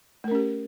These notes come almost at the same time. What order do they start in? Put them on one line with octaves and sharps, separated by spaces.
A3 A#4 C#4 G4